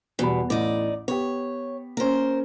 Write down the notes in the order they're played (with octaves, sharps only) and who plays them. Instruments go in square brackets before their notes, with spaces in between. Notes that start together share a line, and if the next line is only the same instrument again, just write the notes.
[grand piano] E2 G3 B5 [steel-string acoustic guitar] B2
[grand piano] A1 A2 [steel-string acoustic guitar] D#4 D5
[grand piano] B3 G4 [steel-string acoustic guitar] C#5
[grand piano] A#3 C#4 [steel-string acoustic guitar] A#4 C5